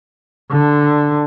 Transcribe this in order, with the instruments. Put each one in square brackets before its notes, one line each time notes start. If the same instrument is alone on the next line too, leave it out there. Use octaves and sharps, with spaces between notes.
[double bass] D3